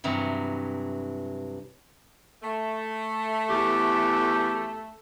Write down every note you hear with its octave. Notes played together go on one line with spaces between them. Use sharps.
G2 C3 E3 F#3
A3
E2 G4